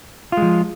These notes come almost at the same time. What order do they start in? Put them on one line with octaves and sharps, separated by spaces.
F4 G#3 F3